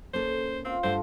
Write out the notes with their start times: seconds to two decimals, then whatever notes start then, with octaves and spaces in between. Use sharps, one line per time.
0.14 A#3 C#4 A4 C5
0.65 C4 F4
0.83 G2 D3 A3 C5